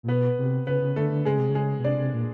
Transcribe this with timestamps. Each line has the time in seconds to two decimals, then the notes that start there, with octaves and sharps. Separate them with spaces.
0.03 A#2
0.08 B2 B3 B4
0.38 C3
0.67 C#3 B3 B4
0.82 C#3
0.96 D3 A3 A4
1.11 D3
1.25 C#3 G#3 G#4
1.38 C3
1.50 C#3
1.55 G#3 G#4
1.79 B2
1.85 C3 D4 D5
1.99 C3
2.14 A#2